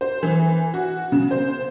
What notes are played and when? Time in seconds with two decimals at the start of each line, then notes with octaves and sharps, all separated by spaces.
0.01 C5
0.23 E3
0.74 F#4
1.12 C#3
1.31 C5